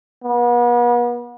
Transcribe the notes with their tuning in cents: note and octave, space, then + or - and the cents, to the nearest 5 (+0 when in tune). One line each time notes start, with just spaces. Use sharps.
B3 -40